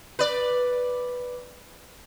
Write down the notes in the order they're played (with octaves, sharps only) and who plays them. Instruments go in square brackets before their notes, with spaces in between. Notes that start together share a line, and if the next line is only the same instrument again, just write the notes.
[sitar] B4 D5